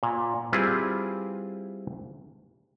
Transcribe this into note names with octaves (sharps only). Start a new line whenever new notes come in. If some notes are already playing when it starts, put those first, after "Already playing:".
A#2
G3 C4 E4 F4 G#4 B4